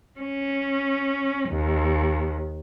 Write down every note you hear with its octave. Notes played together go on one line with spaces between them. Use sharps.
C#4
D#2